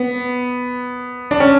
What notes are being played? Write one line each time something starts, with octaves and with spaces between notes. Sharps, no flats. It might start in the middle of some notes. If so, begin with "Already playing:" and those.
Already playing: B3
D4
C#4